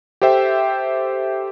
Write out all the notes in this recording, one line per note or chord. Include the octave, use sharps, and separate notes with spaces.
G4 A4 C5 E5 G5